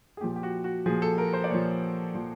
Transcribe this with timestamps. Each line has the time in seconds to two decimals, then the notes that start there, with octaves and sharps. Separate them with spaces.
0.17 G#4
0.21 A#2 F3 G4
0.36 G4
0.43 F#4
0.64 F#4
0.86 A#2 F3 G#4
1.02 A4
1.18 A#4
1.33 C5
1.44 D5
1.50 A#2 F3 C#5
2.14 A#2 F3